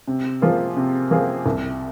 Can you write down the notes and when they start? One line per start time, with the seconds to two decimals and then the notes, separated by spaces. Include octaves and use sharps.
0.07 C3
0.42 F3 A#3 F4 G#4
0.76 C3
1.11 F3 A#3 F4 G#4
1.46 C2